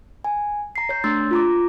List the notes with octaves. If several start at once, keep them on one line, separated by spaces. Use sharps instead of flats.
G#5
A#5 C7
C#5 G6
A3 D4 C6 E6 A6
F4 A#5 D6